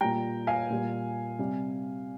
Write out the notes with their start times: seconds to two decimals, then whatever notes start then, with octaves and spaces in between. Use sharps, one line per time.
0.01 A#2 G3 G5 A#5
0.47 F5 G#5
0.70 A#2 G3
1.39 C3 G3